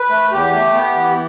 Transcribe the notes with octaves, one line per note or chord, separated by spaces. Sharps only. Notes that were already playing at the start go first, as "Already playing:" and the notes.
Already playing: B4
A3
E2 G4
A3
B3
E3